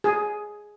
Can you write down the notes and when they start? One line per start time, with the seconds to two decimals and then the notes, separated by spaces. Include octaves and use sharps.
0.04 G#4